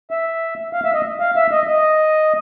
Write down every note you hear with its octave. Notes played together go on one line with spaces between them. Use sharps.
E5
F5
E5
D#5
F5
E5
D#5
D#5